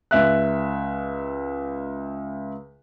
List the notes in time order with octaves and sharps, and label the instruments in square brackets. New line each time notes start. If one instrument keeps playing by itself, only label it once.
[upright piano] C#2 E5 F#6